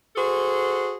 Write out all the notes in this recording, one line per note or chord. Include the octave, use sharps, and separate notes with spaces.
F#4 G#4 A4 C5